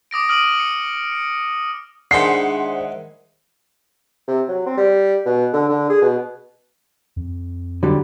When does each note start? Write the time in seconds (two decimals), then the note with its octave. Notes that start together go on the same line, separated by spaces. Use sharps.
0.11 D6 D#6 A#6 D7
0.29 D#6 F6 D7 D#7 F#7
0.60 C#7
1.12 C#7
2.11 D#3 G#3 D4 E4 G#4 C5 F#5 C7
4.28 C3
4.48 F#3
4.66 C4
4.77 G3
5.26 B2
5.53 D3
5.69 D3
5.90 G#4
6.02 B2
7.16 F2
7.83 D3 F#3 G3